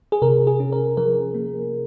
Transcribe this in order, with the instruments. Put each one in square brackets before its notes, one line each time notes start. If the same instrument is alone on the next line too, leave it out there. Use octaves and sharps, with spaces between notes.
[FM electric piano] G#4
C3 A#4
G#4
C#4
A#4
F3 A#4
A#3